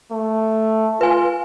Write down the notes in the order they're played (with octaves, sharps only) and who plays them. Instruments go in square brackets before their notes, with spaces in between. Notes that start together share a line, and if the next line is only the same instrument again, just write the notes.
[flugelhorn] A3
[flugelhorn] F4 [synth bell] B4 G#5